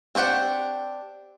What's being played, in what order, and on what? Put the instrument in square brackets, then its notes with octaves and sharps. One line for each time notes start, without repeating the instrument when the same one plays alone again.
[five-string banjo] C4 D4 G4 F#5 G5